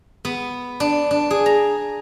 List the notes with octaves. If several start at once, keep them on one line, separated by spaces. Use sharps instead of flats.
B3
D4
D4
G#4
A#5